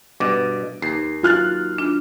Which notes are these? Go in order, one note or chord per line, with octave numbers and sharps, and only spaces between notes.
G2 B2 D6
D#2 C7
F#3 F4 F#4 F6 F#6 A6
D4 F4